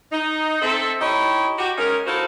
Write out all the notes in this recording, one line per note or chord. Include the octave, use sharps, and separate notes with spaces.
D#4
C4 A4 E5
D#4 E4 G4 C#5 D#5
F#4 G4
G#3 C#4 D#4 A#4
D#4 E4 F#4 A4 C5 F5